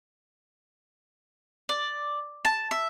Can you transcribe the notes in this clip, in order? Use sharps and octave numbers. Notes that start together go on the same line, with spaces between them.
D5
A5
E5